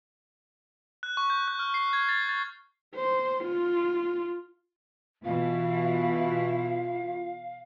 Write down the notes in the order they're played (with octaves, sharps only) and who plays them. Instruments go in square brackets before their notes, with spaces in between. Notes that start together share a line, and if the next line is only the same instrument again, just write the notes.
[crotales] F#6
C#6
G6
F#6
F6
C7
G#6
A6
A6
[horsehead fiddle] C5
F4
[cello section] B2 E3 E4 [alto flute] F4 [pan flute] F5